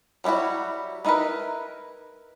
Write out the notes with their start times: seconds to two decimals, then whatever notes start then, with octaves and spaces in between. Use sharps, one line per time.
0.24 F#3 G3 B3 E4 F#4
1.05 B3 D#4 E4 A#4 B4